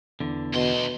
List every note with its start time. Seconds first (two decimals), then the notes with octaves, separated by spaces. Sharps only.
0.20 E2 D3
0.54 D2 B2 C6